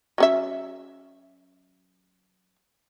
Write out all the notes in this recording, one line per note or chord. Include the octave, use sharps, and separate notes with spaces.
F#3 C#4 E5